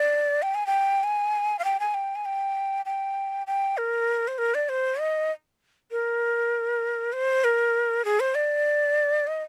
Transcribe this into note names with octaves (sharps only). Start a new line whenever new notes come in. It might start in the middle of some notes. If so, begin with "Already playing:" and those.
Already playing: D5
G5
G#5
G5
G#5
F5
G5
G#5
G5
G#5
G5
G5
G5
A#4
C5
A#4
D5
C5
D#5
A#4
C5
A#4
G#4
C5
D5
D#5